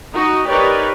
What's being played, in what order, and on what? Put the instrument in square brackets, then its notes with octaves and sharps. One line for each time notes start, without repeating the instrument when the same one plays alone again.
[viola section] D#4 F#4 D#5
D#4 G4 A#4 B4 C#5 D5